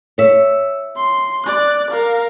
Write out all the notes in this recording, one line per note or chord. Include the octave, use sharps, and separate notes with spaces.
C#5 E5
C6
D5 F#6
A#4 F5